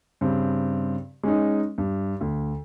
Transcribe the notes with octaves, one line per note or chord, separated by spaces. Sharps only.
G2 C#3 C4
G#3 C#4 D#4
G2
D2